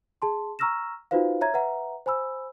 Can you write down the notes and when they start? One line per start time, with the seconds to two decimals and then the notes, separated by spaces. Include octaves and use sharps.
0.22 G#4 A5 C6
0.59 A#5 C#6 E6 F6 A#6 E7
1.11 D#4 F4 F#4 B4 C5 F5
1.41 C#5 E5 A#5 G#6
1.54 B4 E5 F#5 A#5
2.06 C5 G#5 B5 E6